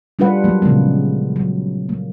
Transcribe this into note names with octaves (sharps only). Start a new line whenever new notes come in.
G3 D4 F4 B4 F#5
F#3 A#3
A#2 C#3 F3 G#3 B3
F#3
A#3